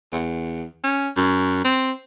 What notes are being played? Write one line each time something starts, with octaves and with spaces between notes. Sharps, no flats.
E2
C#4
F#2
C4